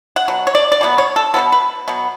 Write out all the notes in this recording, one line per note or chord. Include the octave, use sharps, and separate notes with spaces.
F#5
B2 F#3
C#5
D5
D5
B2 F#3 B3
C#5
A4
B2 F#3 B3 A4
B4
B2 F#3 B3